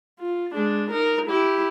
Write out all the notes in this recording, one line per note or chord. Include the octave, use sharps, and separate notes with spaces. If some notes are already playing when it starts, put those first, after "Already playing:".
F4
G#3 D4
D#4 A#4
E4 G4